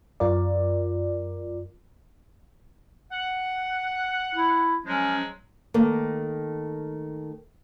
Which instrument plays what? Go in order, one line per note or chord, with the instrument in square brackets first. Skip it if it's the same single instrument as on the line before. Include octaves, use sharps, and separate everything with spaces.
[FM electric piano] F#2 F4 A#4 D5
[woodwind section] F#5
[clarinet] E4
[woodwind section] F3 F#3 G#3 [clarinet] C#4
[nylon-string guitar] D#3 A3 A#3